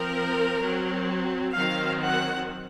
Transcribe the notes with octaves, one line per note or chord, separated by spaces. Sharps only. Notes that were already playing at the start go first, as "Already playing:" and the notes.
Already playing: F3 C4 A#4
F#3 C4
D#3 F#3 C4 F5
F#5